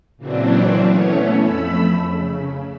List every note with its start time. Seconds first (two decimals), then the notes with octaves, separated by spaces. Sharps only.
0.17 A#2 C#3 E3 F#3 C4 D4
0.83 E3 A3 B3 C#4 C#5
1.38 F2 A3 B5 E6
2.00 C#3